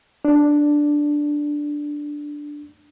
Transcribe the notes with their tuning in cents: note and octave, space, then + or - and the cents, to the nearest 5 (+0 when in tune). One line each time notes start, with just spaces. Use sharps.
D4 +0